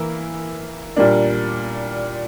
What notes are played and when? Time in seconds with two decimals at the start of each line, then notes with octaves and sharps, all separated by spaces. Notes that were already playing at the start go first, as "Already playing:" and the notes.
Already playing: E3 A#3 E4 A#4
0.96 A#2 G3 A#3 D4